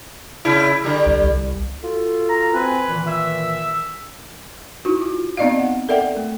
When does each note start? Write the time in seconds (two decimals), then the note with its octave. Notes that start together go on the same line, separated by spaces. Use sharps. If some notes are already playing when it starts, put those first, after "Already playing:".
0.45 C#3 E4
0.84 D3 G3
1.06 C2
1.23 C2
1.81 F4 F#4 A4
2.29 A#5
2.54 C4 B4 G#5
2.88 A#2 D#3 E3
3.08 E5
4.85 D#4 E4 F#4
5.01 F4
5.37 B3 C4 D#4 D5 D#5 F5
5.59 F#5
5.89 A4 A#4 D5 E5 F#5 G5
6.17 A3